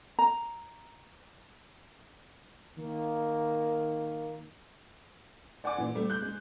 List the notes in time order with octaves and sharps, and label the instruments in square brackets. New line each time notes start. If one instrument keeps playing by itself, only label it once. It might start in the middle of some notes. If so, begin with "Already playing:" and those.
[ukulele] A#5
[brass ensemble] D#3 A#3
[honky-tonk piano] D5 F#5 G#5 D6
A#2 E3
G3 A3
F#6 G6
G#3